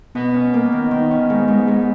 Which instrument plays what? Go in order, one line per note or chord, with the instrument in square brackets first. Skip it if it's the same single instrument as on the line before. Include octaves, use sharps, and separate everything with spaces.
[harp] B2 [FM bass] B3
[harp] C#4
A#3
D#3
D#3
C#4
G#2
G#2
G#2